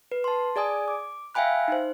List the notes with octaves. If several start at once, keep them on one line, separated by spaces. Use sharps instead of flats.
B4
A5 C6
G#4 D5 G#5 D#6
D6
E5 F5 G5 G#5 B5 F#6
D#4 C5